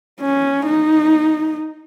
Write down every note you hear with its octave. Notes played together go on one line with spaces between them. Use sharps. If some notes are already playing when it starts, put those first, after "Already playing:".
C#4
D#4